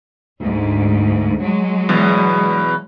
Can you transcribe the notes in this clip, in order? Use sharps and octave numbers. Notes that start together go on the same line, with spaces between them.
D2 G#2
F#3 G#3
E2 B2